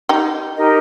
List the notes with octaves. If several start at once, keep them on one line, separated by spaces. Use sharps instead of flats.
D#4 G4
D#4 G4 A#4 D#5